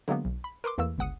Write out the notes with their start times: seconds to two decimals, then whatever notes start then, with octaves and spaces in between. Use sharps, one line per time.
0.08 D3 F#3 G#3 A#3 B3
0.25 B1
0.44 B5
0.64 A#4 B4 C6 D6
0.78 E2 E3 A3 A#3 E6
0.98 G1 C#2 F#5 D#6 C#7